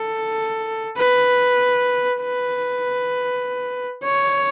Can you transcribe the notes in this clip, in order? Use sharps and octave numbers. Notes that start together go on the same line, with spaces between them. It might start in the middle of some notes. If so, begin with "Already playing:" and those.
Already playing: A4
B4
B4
C#5